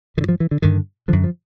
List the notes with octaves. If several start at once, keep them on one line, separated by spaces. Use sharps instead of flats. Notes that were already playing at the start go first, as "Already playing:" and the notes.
G2 D3 D#3
F3
E3
D3
G2 D3 D#3
F#2 D3 F3
F3